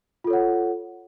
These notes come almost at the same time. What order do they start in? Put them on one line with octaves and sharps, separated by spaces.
F4 A4 C#5 F#5